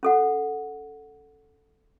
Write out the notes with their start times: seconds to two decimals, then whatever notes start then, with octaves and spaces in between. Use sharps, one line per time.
0.03 C#4 A4 F#5